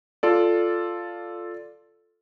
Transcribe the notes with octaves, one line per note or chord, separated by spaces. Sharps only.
F4 A4 D5